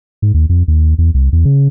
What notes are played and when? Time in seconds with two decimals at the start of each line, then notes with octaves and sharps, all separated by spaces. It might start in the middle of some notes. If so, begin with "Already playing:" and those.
0.22 G#2
0.34 D#2
0.49 F2
0.68 D#2
0.98 E2
1.14 C2
1.32 E2
1.45 C#3